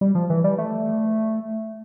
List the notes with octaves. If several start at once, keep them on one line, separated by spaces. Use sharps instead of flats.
G3
F3
E3
G3
A3